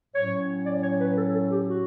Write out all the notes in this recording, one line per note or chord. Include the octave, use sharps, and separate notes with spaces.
A2 F#3 C#4 C#5
D5
C#5
B4
A4
A4
G4
F#4